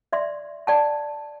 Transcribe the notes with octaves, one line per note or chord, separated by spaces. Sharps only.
D5 E5 C6
D5 G5 A5